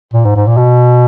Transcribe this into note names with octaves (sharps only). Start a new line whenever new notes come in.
A#2
G#2
G#2
A#2
B2